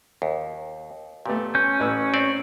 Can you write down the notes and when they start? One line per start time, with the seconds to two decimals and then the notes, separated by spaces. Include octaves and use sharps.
0.22 D#2
1.26 A#2 A3 B3 G4
1.55 C#4 G6
1.80 A1 B4 E6
2.14 C4 D5 E5